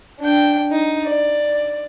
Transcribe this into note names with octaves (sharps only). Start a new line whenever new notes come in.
D4 G5
D#4
D5